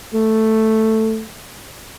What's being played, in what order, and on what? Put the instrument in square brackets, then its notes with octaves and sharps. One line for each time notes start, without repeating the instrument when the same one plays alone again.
[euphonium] A3